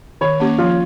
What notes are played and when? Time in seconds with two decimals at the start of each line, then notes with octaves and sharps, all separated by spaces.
0.21 D#3 C#5
0.40 A#3 C#4 G4
0.58 F3 F4